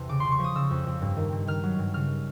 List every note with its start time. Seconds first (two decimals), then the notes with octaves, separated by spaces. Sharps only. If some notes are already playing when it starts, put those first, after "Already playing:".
Already playing: E2 C3 A5
0.09 C#3 D6
0.20 C#3 C6
0.32 C#6
0.39 F3 D#6
0.55 C#3 E6
0.71 F2
0.87 F2
1.02 G2
1.17 D#3
1.32 G2
1.47 D#3 F6
1.63 F#3
1.79 G2
1.94 C#3 F6